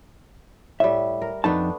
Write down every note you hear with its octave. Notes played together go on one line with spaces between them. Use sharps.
A2 G3 E5
A#4
F2 A3 B3 D4 D#4 A5